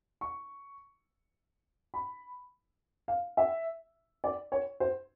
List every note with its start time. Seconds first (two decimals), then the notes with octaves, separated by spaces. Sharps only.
0.21 C#6
1.94 B5
3.08 F5
3.37 E5
4.24 D5
4.52 C#5
4.80 C5